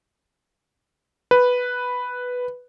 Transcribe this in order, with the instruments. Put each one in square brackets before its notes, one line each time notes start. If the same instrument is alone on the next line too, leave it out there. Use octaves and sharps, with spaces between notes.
[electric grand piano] B4